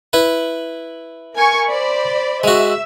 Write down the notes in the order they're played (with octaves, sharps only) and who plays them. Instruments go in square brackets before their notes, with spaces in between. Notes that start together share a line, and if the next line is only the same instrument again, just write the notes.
[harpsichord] E4 B4
[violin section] A#4 G#5 C#6
C5 D5 B5
[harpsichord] G#3 F#4 [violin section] E5 E6